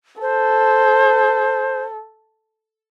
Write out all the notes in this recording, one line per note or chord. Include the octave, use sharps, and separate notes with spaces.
A4 C5